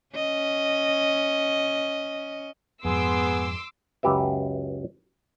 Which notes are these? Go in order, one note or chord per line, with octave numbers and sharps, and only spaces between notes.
C#4 D#5
F2 G#2 B3 G#4 C6 D6 E6
C#2 F#2 G4 B4 E5